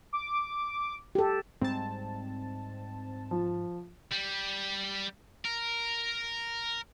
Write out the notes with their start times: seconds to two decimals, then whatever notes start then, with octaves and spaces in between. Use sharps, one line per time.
0.13 D6
1.15 G4 A4
1.61 G#2 G3 C4 A5
3.31 F3
4.11 G3
5.45 A#4